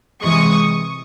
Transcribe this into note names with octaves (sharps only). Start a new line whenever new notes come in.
C3 E3 G#3 C#6 D#6